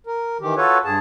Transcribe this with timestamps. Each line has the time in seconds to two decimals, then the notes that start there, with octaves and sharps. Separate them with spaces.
0.07 A#4
0.41 D#3 E3 G4
0.57 F4 F#4 A4 B4 C#5
0.85 G2 G#4 A5